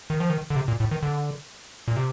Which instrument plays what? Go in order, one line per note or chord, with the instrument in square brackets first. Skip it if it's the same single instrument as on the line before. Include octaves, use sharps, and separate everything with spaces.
[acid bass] D#3
F3
D#3
D3
C3
A#2
A2
D#3
D3
A#2
C3